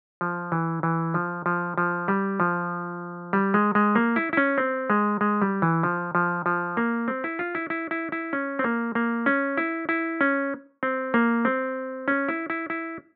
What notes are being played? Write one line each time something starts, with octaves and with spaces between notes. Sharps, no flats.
F3
E3
E3
F3
F3
F3
G3
F3
G3
G#3
G#3
A#3
E4
E4
C#4
C4
G#3
G#3
G3
E3
F3
F3
F3
A#3
C4
E4
F4
E4
E4
E4
E4
C#4
C4
A#3
A#3
C#4
E4
E4
C#4
C4
A#3
C4
C#4
E4
E4
E4